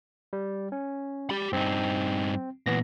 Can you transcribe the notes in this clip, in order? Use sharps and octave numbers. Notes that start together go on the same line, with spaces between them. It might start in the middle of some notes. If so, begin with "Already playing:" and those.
G3
C#4
G4 B5
G2 C4 D#4
A#2 E3 B3 A#6